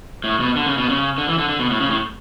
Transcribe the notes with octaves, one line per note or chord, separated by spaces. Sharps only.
A2
B2
D3
C#3
B2
C#3
D3
E3
D3
D3
B2
A2
C#3
A2